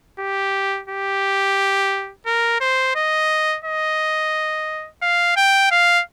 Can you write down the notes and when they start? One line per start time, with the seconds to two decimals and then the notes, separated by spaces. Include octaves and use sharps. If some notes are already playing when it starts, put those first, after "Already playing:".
0.19 G4
0.88 G4
2.26 A#4
2.60 C5
2.95 D#5
3.65 D#5
5.02 F5
5.36 G5
5.71 F5